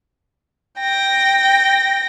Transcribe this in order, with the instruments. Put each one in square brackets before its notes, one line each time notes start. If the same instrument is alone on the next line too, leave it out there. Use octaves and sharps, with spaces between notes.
[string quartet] G5 A#6